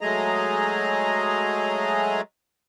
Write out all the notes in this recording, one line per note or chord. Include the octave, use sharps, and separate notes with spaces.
F#3 G#3 A3 G#4 D#5 A#5